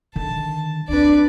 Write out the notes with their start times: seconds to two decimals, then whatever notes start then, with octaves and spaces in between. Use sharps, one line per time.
0.16 D3 D#3 A5
0.88 D2 C4 D4 B4 D5